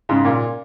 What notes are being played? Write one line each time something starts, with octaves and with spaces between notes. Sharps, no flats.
G#2 C#3
A#2